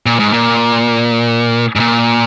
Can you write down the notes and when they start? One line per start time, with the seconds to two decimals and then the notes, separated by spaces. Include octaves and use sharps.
0.06 A#2
0.19 G#2
0.33 A#2
1.76 G#2
1.80 A#2